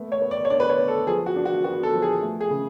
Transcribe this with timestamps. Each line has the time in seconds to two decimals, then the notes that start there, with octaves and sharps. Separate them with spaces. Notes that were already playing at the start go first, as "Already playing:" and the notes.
Already playing: A3 B3
0.12 C#5
0.22 B3
0.31 D5
0.45 C#5
0.50 D4 D5
0.60 B4
0.69 C#5
0.78 B3
0.88 A4
1.07 F3 G#4
1.26 F#4
1.36 D4
1.45 F#4
1.64 B3 F#4
1.83 A4
1.94 F3
2.02 G#4
2.21 A3
2.41 G#4
2.50 C#3